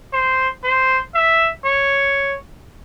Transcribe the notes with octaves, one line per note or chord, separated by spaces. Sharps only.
C5
C5
E5
C#5